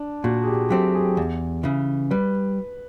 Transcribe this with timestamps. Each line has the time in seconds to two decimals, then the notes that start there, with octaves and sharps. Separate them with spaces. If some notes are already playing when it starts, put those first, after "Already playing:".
Already playing: D4
0.24 A#2 F#4
0.43 G#4
0.47 G4
0.70 F#3 A3 C4 G4
0.95 G#4
1.17 E2
1.63 C#3 E3
2.11 G3 B4